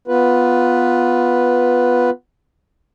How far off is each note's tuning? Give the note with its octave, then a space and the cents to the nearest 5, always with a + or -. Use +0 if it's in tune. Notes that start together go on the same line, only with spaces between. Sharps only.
B3 +0 F4 +10 B4 +0